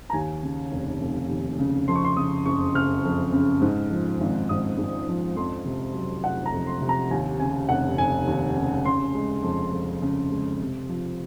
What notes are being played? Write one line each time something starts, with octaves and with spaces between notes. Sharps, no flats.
A#5
D#2 G#5
C#3
F1
F1
D#2
C#3
F2 C6
C#6
C6
C#3 D#6
F#1 C#6
F#1 F6
F2
C#3
G#2
F3
G#1
G#1 D#6
G#2
F3
F2 C6
C3
F#3
F1 F#5
A#5
F2
C6
C3
A#5
D#2 G#5
C#3 G#5
F1 F#5
F1 G#5
D#2
C#3
C#3 C6
G#3
F2
F2
C#3
G#3
C3
F3